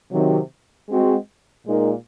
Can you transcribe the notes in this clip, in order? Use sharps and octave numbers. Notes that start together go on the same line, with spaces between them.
C3 D#3 F#3
G#3 C4 F#4
A#2 G#3 D#4 A#4